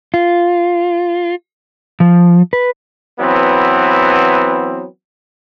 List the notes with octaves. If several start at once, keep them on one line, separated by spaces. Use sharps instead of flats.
F4
F3
B4
E3 F#3 B3 C4